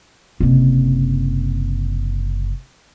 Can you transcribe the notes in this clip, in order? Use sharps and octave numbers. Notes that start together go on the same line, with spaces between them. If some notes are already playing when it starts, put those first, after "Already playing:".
F#1 C3